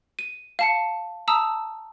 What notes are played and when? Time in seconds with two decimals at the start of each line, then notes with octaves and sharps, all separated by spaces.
0.19 D#7
0.59 F5 A5 C#7
1.28 A5 A#5 D#6 E6